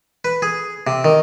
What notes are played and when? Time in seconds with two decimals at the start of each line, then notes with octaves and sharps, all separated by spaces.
0.25 B4
0.42 G#4
0.87 C3
1.04 D#3